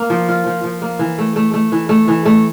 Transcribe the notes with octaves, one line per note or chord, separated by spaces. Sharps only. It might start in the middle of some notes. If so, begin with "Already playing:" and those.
Already playing: A#3
F3
F4
F3
F3
A#3
E3
A3
A3
A3
E3
A3
E3
A3